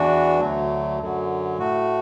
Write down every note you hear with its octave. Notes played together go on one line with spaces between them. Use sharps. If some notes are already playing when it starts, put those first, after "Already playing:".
Already playing: E2 E3 D4 F#4
D2 D3 F#3 A3
F#2 D3 F#3
A2 A3 F#4